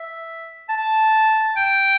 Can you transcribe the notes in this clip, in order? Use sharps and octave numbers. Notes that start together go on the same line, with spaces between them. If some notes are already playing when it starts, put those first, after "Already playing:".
Already playing: E5
A5
G5